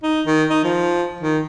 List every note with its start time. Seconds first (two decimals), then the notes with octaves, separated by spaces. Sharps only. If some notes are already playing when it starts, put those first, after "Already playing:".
0.03 D#4
0.26 D#3
0.50 D#4
0.64 F3
1.21 D#3